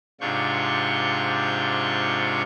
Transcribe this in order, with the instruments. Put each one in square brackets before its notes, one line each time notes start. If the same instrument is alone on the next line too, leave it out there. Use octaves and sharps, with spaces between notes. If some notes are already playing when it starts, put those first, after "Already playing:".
[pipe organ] G#2 C3 D4 F4 C#6 G6